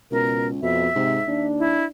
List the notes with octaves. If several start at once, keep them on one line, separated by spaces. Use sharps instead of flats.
C#2 B2 A#4
F2 B2 E5
G#2 C3
D#2 D4
E4